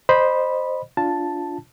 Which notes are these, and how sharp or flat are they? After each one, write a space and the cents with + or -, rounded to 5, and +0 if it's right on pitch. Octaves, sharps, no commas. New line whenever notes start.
C5 +0 D#5 -20 B5 -10
D4 -15 F4 +0 A5 +0